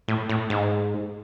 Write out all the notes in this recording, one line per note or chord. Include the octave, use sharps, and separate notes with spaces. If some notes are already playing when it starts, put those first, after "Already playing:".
A2
A2
G#2